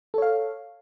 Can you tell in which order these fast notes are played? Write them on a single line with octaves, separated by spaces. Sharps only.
A4 C#5 F5